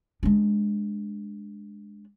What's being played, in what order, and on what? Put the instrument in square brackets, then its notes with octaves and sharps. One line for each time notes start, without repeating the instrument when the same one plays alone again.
[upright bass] G#3 D4